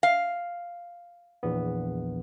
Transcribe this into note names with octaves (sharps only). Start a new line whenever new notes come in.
F5
A#1 E2 B3